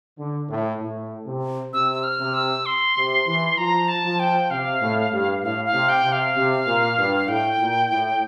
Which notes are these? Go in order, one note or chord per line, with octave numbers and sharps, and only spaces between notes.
D3
A2
A2
C3
C3 E6
E6
F6
C3
E6
C6
C3
E3
F3 A#5
A5
F3
G5
C3 F5
A2
G2
A2 F5
F5
C3
G5
C3
F5
C3
A#2
G2
A2 G5
A#2
A2